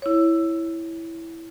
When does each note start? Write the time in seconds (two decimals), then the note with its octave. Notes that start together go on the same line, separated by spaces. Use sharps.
0.02 E4 C#5